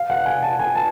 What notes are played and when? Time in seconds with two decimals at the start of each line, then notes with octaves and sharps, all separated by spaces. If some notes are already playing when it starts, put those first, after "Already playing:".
Already playing: F5
0.10 F#5
0.26 G#5
0.42 A5
0.59 G#5
0.75 A5